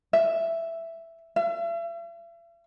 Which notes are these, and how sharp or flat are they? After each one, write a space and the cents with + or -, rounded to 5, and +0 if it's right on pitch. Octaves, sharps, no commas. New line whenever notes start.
E5 +5
E5 +45